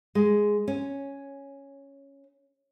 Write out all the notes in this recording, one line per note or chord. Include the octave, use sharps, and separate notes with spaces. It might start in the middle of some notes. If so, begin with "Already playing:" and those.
G#3
C#4